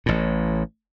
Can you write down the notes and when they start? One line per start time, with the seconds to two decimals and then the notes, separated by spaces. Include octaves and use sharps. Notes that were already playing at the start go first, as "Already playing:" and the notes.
0.06 A1 A2